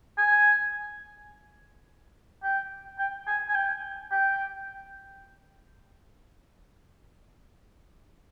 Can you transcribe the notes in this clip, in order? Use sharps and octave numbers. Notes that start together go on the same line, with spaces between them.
G#5
G5
G5
G#5
G#5
G5
G5